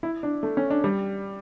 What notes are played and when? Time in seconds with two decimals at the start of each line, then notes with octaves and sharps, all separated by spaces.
0.03 E4
0.23 D4
0.43 A3
0.57 C#4
0.70 D4
0.84 G3